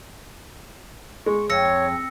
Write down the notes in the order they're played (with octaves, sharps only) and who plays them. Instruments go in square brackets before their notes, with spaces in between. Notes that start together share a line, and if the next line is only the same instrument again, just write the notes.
[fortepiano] G#3 [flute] C#6
[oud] F2 [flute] C#5 [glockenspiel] E6 A#6 C#7